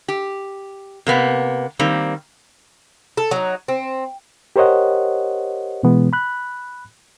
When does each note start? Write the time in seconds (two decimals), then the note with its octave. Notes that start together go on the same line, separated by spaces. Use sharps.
0.08 G4
1.07 C3 A#3 B3
1.79 D#3 G3 A#3 C4
3.17 A4
3.31 F#3 D#4
3.68 C4
4.56 G4 A#4 C5 C#5 D#5 F#5
5.83 B2 E3 G#3 B3
6.13 B5 F#6